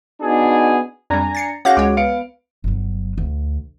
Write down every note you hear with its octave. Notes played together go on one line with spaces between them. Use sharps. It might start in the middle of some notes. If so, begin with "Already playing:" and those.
B3 D4 D#4 F#4 G#4
F2 G3 D4 G#5 A#5
A6 C7 C#7
C#4 F#4 G#4 F5 F#5 D6 G6 A#6
C#2 G#3 C#5 D6
B3 F5 C#7 D7
G1 F#3
D2